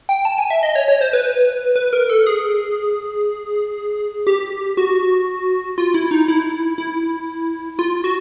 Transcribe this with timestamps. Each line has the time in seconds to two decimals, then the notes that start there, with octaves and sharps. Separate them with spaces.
0.09 G5
0.25 A5
0.38 G#5
0.50 E5
0.63 D#5
0.75 C#5
0.88 C#5
1.01 C5
1.13 B4
1.76 B4
1.93 A#4
2.09 A4
2.26 G#4
4.27 G4
4.77 F#4
5.78 F4
5.94 E4
6.11 D#4
6.28 E4
6.78 E4
7.79 F4
8.04 F#4